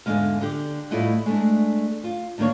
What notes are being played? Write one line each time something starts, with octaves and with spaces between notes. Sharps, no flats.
E2 G#2 D3 E3 G#3 F5
D3 G4
A2 G3 E4 F4 D#5 F#5
G#3 A3 D4
F4
D2 D#3 A#3 D4 C#5